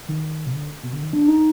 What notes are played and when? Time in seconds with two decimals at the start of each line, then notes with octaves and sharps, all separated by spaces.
0.08 D#3
0.46 B2
0.53 D3
0.83 B2
0.93 D3
1.03 D#3
1.13 D4
1.28 D#4